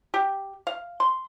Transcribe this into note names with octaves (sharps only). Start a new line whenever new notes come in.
G4
F5
C6